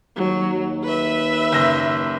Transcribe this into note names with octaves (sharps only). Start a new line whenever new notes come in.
D#2 F#3
B4 E5
F#1 E6 A#6